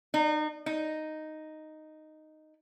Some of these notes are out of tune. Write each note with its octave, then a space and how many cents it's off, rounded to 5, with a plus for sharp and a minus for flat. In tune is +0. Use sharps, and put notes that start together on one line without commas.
D#4 -30
D#4 -5